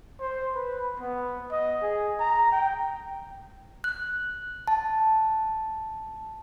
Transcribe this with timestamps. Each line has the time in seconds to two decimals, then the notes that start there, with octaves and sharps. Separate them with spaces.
0.20 C5
0.55 B4
0.99 B3
1.51 D#5
1.82 G#4
2.19 A#5
2.52 G5
3.84 F#6
4.68 A5